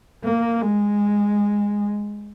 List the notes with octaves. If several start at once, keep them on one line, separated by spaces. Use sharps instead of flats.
A#3
G#3